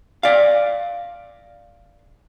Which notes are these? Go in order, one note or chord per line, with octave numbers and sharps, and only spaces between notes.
D5 F5